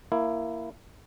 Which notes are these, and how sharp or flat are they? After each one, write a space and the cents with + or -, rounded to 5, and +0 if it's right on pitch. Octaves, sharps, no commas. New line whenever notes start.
A#3 +0 E4 +10